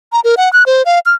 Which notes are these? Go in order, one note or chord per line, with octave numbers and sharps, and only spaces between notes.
A#5
A#4
F#5
F#6
C5
F5
F6